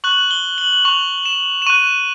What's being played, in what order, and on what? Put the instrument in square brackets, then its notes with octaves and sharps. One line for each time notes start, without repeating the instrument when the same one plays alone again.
[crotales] C#6 F#6 F#7
G7
F#7
F#7
C#6 F#6 F7
E7
E7
C#6 F#6 D#7
E7